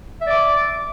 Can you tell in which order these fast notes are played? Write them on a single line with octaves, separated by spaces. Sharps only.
E5 D5 D6